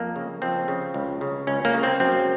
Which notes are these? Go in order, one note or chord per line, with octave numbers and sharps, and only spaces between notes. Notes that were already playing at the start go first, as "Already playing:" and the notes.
Already playing: F2 A#3
C#3
F2 C4
C#3
C#2
C#3
C#2 C#4
A#3
C#3
C4
F#2 C4